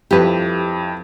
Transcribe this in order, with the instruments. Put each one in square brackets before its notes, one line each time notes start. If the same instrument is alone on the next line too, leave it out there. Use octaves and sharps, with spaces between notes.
[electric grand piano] F2 F3 E4 [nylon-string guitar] G4 B4